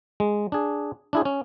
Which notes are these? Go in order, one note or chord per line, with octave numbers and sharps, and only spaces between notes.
G#3
D4 G#4
D4 E4 G#4
C#4